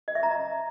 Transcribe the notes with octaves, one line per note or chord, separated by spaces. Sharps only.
D#5
E5
A#5